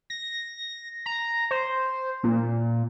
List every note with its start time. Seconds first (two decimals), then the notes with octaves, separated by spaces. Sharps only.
0.10 A#6
1.06 A#5
1.51 C5
2.23 A#2